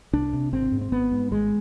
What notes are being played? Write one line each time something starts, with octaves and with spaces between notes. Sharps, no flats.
C2 D4
C3
G#1 C4
G#2
C4
G#1 B3
G#2
G#1 G#3